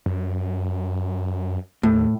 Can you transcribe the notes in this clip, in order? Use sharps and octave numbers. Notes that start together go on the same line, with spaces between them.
F#2
D#2 A2